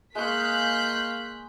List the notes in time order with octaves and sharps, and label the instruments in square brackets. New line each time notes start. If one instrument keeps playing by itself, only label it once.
[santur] G#3 C#6 [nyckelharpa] A#3 F5 [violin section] F#6 G6 B6